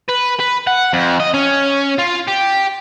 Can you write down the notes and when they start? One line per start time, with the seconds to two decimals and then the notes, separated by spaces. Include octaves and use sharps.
0.09 B4
0.40 B4
0.67 F#5
0.93 F2
1.20 D#5
1.34 C#4
1.99 F4
2.28 G4